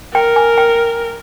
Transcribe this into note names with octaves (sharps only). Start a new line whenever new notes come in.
A#4 G5
G#5
G5